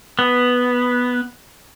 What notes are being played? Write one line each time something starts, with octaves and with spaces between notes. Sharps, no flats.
B3